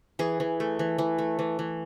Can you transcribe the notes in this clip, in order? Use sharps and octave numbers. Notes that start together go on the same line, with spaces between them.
E3 G#4
E3
A3
E3
E3
A3
E3
E3